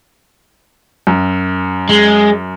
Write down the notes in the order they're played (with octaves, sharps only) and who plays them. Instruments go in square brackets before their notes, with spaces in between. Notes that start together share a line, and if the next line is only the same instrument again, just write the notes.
[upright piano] F#2
[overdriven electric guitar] G#3